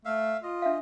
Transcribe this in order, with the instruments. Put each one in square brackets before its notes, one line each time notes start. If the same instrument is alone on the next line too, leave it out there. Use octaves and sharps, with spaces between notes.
[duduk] A3 [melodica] E5 F5
[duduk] F4 [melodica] D#5
[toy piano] D4 E5 F5